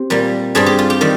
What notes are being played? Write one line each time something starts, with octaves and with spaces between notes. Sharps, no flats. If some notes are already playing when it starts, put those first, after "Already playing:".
Already playing: C4 G4
A#2 G3 A#3
G2 G3 C4 G#4
G4
F4
G4
D#3 G3